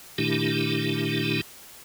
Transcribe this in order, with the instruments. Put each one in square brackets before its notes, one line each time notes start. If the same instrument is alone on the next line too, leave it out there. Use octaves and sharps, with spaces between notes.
[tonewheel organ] A#2 D#3 A3 D4 E4 G4